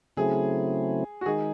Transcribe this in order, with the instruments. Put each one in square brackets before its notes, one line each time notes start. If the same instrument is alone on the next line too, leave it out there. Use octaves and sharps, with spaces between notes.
[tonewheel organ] C#3 F#3 A3 C4 E4 [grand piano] G#4
[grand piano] F#4
[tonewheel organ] D#3 G#3 D#4 [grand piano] G#4